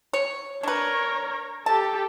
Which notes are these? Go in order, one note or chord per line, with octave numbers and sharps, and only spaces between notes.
C#5
D4 A#4 B4 C#5
G4 A4 A5